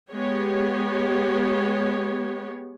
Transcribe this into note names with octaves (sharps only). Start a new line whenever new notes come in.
G#3 B3 G4 C#5